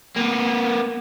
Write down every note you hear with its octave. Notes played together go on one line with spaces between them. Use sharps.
A#3 B3